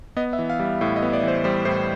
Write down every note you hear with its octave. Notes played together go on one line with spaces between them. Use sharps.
B3 D#5
E5
E3
F5
G3
A2 E5
D#5
B3
D5
E3 C5
G3 C5
A2 C5